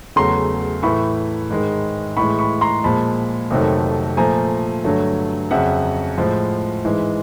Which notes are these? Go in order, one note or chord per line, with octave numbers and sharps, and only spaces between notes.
E2 C#3 F#3 A3 A#5 C6
A2 E3 A3 B5 C#6
G#2 D#3 G#3
A2 E3 G#3 B5 C#6
B5 C#6
A#5 C6
A#2 F3 G#3 A5 B5
F2 C3 D#3 F#3 A3
A#2 F3 A3 G#5 A#5
G2 D3 F#3 A3
F2 C#3 F#3 E5 F#5
A2 F3 G#3
G#2 E3 G#3